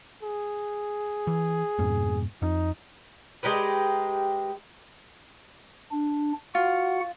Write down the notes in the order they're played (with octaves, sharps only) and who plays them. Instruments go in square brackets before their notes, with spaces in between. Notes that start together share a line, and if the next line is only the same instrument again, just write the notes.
[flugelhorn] G#4
[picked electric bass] E3
F2 G#2 B2
[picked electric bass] F2 [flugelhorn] D#4
[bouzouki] G#3 G4 A#4 B4
[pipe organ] D4
[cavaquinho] F4 [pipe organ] F#4 F#5